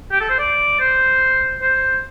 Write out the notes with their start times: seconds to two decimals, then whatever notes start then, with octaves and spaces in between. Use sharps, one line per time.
0.12 G4
0.21 A4
0.30 C5
0.39 D5
0.80 C5
1.62 C5